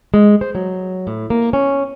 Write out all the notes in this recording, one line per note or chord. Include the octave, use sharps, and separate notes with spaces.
G#3
C5
F#3
A2
A#3
C#4